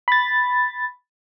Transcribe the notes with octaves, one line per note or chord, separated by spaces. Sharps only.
B5 A6